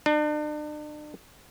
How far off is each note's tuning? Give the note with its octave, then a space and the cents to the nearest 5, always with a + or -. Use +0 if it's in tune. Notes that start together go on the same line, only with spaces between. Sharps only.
D4 +40